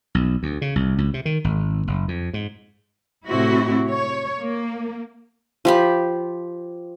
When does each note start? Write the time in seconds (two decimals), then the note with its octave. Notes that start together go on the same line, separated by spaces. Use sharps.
0.15 B1
0.43 D2
0.62 C#3
0.76 C2
0.98 C#2
1.14 C3
1.25 D#3
1.44 G#1
1.87 F#1
2.08 F2
2.33 G#2
3.26 A2 C3 C4 E4 F#4
3.89 C#5
4.39 A#3
5.65 F3 G4 B5